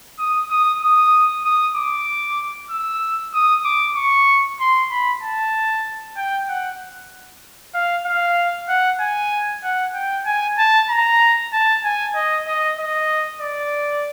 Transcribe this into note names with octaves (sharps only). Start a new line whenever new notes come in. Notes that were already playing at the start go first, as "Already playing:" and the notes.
D#6
D#6
D#6
D#6
D6
E6
D#6
D6
C#6
C6
B5
A5
G5
F#5
F5
F5
F#5
G#5
F#5
G5
G#5
A5
A#5
A5
G#5
D#5
D#5
D#5
D5